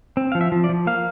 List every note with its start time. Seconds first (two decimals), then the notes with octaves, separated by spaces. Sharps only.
0.17 C4
0.32 F3 F5
0.41 E5
0.52 F3
0.64 D5
0.69 F3
0.87 A#3 F5